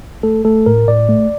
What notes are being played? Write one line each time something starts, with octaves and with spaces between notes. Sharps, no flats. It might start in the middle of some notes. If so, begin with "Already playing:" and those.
A3 A4
A3 A4
A2 A#4
A2 D5
A3